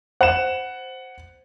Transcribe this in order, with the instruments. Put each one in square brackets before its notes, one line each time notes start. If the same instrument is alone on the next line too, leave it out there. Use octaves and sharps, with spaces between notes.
[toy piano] C5 B5 [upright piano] F#5 E7